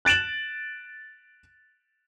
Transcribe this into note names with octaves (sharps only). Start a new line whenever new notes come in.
F#6 A6 D7 E7 F#7